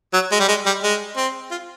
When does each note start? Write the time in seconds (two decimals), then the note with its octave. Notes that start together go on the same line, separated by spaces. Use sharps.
0.13 F#3
0.31 G#3
0.40 G3
0.48 G#3
0.66 G3
0.83 G#3
1.17 C4
1.51 F4